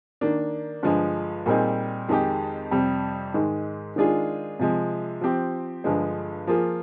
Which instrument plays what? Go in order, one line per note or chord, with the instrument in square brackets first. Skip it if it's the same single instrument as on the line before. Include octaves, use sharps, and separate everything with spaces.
[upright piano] D#3 A#3 D4
G2 D3 F3 G#3
A#2 G3 C4 D#4 G#4
F2 D#3 G#3 D#4 G4
F2 C3 G3
G#2 D#3 G#3
D#3 G#3 D4 F4 G#4
C3 F3 G#3
F3 C4 G4
G2 D3 F3 G#3
F3 A#3 F4 G#4